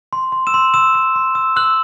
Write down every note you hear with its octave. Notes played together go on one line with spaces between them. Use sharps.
C6
C6
E6 E7
C6
C6 E6 E7
E6
C6
E6
E6 F#6 F#7